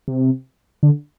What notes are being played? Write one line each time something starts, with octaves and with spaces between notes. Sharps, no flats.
C3
D3